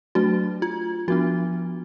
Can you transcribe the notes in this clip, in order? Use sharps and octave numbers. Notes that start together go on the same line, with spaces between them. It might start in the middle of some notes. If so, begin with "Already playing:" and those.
F#3 A3 D4 F#4
F4
F3 B3 D4 F#4